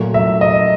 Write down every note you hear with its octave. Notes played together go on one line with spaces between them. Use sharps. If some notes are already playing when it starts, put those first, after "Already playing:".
Already playing: A#2 F#3 A3
E5
D#5